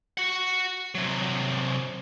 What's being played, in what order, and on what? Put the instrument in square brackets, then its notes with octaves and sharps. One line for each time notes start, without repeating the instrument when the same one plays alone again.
[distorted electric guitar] F#4 F#5
C3 F#3